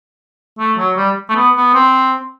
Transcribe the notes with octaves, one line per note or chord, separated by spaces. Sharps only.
A3
F#3
G3
A3
B3
B3
C4